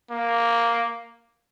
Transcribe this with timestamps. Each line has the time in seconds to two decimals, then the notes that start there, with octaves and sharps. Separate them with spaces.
0.11 A#3